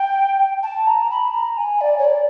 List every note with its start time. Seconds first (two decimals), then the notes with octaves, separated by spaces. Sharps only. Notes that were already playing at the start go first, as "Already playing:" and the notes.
Already playing: G5
0.63 A5
0.87 A#5
1.11 B5
1.34 A#5
1.58 G#5
1.81 D5
1.98 C#5
2.05 D5